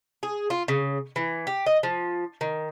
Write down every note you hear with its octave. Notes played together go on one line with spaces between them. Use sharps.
G#4
F4
C#3
E3
G4
D#5
F3
D#3